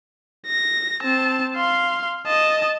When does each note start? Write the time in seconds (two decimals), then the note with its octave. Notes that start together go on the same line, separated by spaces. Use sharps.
0.47 A#6
1.03 C4 A5
1.56 F5 C6
2.27 D#5 A5